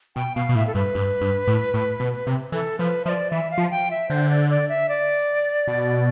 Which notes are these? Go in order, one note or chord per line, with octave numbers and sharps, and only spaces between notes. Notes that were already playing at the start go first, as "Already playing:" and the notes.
B2 G5
B2 F5
B2
A2 E5
A4
G2 B4
G2
G2
A2
A2
B2
C3
E3 A4
F3 B4
F3 E5
D5
E3 E5
F5
F3
G5
E5
D3 C5
D5
D5
E5
D5
B2